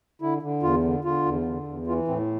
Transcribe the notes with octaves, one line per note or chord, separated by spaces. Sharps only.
D3 E4
D3
E2 F4
D3
D3 F4
E2
D3
E2
E3 F4
A2 C4